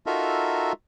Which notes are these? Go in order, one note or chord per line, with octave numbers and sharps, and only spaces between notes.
D#4 F4 F#4 A4 A#4 E5